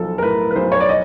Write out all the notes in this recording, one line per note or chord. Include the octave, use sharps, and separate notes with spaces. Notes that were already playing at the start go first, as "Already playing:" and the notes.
Already playing: B1 F3 A4
A#4
A2 B4
B4
B1 C5
C#5
D5
D#5